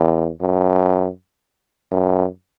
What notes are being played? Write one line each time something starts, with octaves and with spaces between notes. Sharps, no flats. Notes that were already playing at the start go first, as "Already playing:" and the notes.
Already playing: E2
F#2
F#2